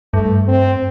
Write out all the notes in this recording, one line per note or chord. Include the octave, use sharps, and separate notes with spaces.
G2 A3
C4